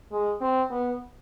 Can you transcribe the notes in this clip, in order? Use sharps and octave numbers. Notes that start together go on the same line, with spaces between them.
G#3
C4
B3